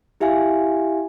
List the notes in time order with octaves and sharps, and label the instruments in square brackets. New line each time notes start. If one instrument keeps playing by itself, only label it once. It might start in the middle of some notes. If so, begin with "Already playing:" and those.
[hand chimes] E4 G4 E5 F5 G#5